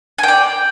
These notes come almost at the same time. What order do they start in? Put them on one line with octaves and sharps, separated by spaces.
G#5 G5 D5